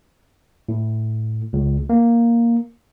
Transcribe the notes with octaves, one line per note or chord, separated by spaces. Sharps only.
A2
C#2
A#3